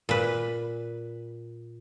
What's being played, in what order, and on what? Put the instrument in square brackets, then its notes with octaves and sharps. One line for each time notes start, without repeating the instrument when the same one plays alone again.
[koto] A#2 B4